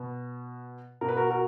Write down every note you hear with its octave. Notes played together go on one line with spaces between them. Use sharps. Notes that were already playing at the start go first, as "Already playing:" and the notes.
Already playing: B2
B2 A#4
B4
F#4 A#4
F#4 A#4